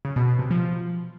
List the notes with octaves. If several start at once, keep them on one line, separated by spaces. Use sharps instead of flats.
C#3
B2
B2
C3
F3